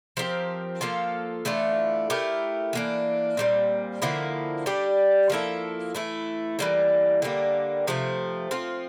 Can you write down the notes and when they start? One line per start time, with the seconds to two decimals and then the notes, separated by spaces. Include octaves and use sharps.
0.17 F3 C4 G4 A#4
0.81 F3 A#3 F4 A4
1.45 E3 A3 D4 F4
2.10 A3 E4 G4 A#4
2.73 E3 A#3 D4
3.37 A#2 G3 C4
4.02 D3 F3 A#3 E4
4.66 G3 D4 G4
5.30 F3 A#3 E4 A4
5.95 E3 A3 E4
6.59 E3 G3 A#3
7.22 D3 G3 A#3
7.87 C3 F3 A3
8.51 F3 C4 F4